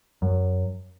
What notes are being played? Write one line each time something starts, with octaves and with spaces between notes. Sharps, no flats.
F#2